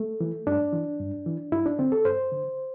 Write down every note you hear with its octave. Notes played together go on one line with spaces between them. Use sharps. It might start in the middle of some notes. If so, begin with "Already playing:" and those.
Already playing: A3
E3
G2 D4
E3
G2
E3
G2 E4
D4
D3 C4
A4
G2 C5
D3